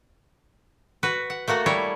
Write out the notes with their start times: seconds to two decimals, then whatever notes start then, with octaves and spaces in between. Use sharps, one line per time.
1.03 F#4 B4
1.30 F#5
1.48 A3 A#3 F#4 A4
1.66 G3 E4 C#5